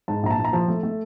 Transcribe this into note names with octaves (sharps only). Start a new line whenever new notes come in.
G#2 A5
A#1 A#5
A5
A#1
A#5
F3 A5
A3
A3